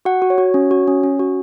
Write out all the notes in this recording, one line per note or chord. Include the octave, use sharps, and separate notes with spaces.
F#4 F#5
F#4
C#5
F#4
C#4
F#4
C#4
C#4
F#4